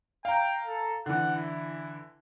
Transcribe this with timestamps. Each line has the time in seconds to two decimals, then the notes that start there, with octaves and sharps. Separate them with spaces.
0.25 F5 G5 A#5
0.66 A4
1.06 D3 E3 F#5
1.36 E4